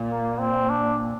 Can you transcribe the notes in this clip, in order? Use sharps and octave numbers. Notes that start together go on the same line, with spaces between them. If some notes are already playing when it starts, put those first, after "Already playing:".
Already playing: A#2
A#3
C4
D4